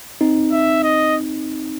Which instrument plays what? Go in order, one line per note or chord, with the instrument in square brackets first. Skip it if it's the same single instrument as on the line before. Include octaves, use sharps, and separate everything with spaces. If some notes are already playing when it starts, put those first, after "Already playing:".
[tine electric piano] C4 D#4
[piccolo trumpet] E5
D#5